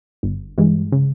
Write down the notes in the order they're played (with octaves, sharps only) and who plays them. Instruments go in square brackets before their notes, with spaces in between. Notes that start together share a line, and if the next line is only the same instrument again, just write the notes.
[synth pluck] G1
G2 E3 G#3
C#3